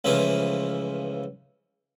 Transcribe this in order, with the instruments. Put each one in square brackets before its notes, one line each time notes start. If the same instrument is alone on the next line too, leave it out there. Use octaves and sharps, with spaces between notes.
[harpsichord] C#2 C#3 E3 F3 A3 E5